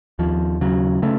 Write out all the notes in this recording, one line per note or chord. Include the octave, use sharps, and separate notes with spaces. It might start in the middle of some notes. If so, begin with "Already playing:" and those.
D#2 F3
C#3 F#3
C#3 A3